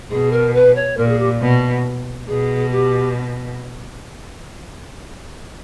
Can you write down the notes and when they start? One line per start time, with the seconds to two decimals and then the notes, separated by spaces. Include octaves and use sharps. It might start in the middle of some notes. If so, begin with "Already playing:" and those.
0.10 B2 G#4
0.32 A#4
0.54 B4
0.75 C#5
0.97 A#2 A#4
1.09 G#4
1.19 G4
1.41 B2
2.27 B2 G#4
2.72 G4